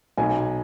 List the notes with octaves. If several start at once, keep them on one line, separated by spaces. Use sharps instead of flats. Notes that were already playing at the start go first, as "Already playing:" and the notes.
B1 G#5